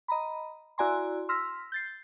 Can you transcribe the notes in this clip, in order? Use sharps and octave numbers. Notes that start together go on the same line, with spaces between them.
D#5 A#5 B5
E4 F#4 D5 G#5 A#5 C6
C6 E6 F6 A#6 B6
G6 A6 C7